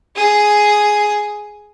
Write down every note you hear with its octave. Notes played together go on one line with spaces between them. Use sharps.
G#4 D#6